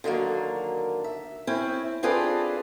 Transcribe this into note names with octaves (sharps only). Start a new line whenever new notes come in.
D3 D#3 F#3 A#3
E5
C4 C#4 E4
C4 D4 F4 G#4 A4 B4